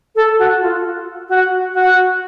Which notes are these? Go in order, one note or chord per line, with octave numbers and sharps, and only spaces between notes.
A4
F#4
F4
F#4
F#4